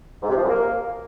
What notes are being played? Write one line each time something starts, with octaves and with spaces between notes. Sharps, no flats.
G#2
C3
F3
F#2
A#3